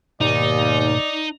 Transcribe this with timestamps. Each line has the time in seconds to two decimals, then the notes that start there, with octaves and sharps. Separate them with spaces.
0.21 D#2 G#2 B2 D#4 D5